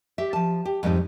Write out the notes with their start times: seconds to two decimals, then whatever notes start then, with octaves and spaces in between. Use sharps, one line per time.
0.18 G4 E5
0.33 F3 A5
0.65 G4
0.83 F2 G#2 G3 B3 C4 D#4